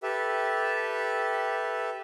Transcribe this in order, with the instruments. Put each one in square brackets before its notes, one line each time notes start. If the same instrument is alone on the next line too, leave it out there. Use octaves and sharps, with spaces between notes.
[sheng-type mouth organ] G4 A4 B4 E5